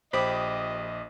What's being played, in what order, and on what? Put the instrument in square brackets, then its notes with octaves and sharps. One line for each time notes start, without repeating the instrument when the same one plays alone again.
[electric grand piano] A#1 D6 D#6 [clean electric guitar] G4 B5 [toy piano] C5 [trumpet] D#5